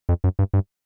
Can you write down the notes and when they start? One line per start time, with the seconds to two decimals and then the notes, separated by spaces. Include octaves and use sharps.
0.09 F2
0.24 F#2
0.39 G2
0.54 G2